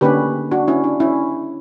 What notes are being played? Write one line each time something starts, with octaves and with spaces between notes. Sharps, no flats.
D3 A#3 C#4 G4 B4
D4 F#4
C#4 E4
D4
C#4 E4